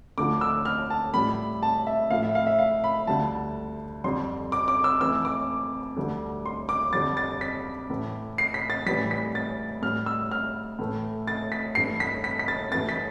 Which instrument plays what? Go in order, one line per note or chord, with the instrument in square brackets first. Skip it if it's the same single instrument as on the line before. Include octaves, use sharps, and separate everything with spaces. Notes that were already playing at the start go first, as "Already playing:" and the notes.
[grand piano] D2 D3 F3 A3 D6
E6
F6
A5
A2 G3 B5
A5
E5
A2 F3 A3 F5
E5
F5
E5
F5
B5
D2 D3 G3 A5
F2 D3 G3 C6
D6
D6
E6
F2 E3 A3 E6
D6
D2 D3 G3
C6
D6
F2 D3 G3 A6
A6
B6
A2 E3 A3
C7
B6
A6
A2 E3 G3 B6
B6
A6
A2 G3 F6
E6
F6
A2 E3 A3
A6
B6
G2 E3 A3 C7
B6
B6
B6
A6
G2 E3 A3 A6
B6